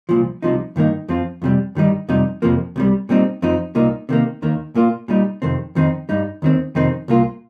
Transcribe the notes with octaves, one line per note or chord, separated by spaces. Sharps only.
C2 A#2 F3
C2 C3 F3 D#4
G2 D#3 A#3 D#4
F2 F3 C4 F4
F2 C3 G3
G2 D#3 G3 D#4
F2 C3 G3 D#4
F2 C3 F3 A#3
C2 C3 G3
A#2 G3 C4 D#4
F2 F3 C4 D#4
C2 A#2 A#3 D#4
C3 D#3 A#3
D#2 D#3 A#3
A#2 A#3 F4
A#2 G3 D#4
F2 C3 D#3 C4
F2 D#3 C4 D#4
G2 G3 D#4
D#2 D#3 C4
F2 C3 D#3 C4 D#4
C2 A#2 A#3 F4